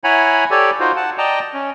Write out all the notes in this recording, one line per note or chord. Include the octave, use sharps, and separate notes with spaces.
E4 C#5 F#5 G#5 A#5 B5
G4 A4 C#5 D5
D#4 F4 F#4 C5
F#5 A5
D5 D#5 G5 A5 A#5
C#4